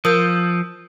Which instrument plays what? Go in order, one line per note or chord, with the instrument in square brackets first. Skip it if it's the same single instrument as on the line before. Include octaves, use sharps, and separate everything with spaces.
[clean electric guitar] F3 [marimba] A#4 [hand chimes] D#6 E6 G6